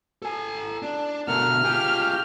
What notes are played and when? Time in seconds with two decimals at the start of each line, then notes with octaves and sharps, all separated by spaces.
0.22 A4 G#5
0.82 D4
1.28 B2 D3 A3 A#4 F#5 F6
1.64 F4 G4 G#4 G5